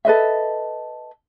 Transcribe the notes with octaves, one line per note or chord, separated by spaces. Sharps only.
A4 B4 D#5 E5